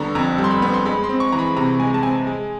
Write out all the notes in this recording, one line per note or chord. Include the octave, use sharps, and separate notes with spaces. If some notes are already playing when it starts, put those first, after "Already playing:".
Already playing: D3 G3 B3 A#5 C#6
F2 A#5
G3
C6
B5
B3
C6
G#3 B5
C6
C4
C#6
E3 A#5
B5
C3 A#5
G#3 G#5
A5
C4 G#5
G#3